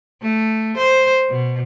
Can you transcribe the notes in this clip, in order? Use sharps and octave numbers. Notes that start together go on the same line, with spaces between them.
A3
C5
B2